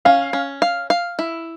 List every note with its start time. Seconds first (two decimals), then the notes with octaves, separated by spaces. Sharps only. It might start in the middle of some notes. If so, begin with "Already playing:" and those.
0.05 C#4 F5
0.33 C#4
0.62 F5
0.90 F5
1.19 E4